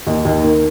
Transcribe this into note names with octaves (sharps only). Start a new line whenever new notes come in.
D#2 D#4
D#2
D#3